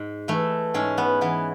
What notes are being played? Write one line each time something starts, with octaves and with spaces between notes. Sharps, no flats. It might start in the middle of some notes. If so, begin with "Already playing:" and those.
Already playing: G#2
E3 A3
G#2 C#4
B3
E3 B3